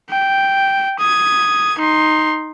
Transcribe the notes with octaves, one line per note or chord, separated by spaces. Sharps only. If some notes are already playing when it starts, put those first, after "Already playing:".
G5
D#6 G#6
D#4 C6